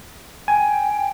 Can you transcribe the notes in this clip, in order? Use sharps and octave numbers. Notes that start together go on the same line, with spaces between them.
G5 G#5